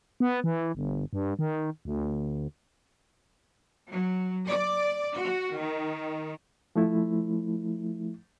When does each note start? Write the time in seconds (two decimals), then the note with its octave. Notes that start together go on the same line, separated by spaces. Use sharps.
0.20 B3
0.44 E3
0.75 G1
1.13 G2
1.39 D#3
1.85 D2
3.91 F#3
4.46 D5
5.16 F#4
5.54 D#3
6.76 F3 A3 E4